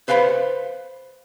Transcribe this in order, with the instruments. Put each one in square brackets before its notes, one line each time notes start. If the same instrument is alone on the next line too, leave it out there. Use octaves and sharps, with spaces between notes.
[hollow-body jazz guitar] B4 C5 F5 G5 B5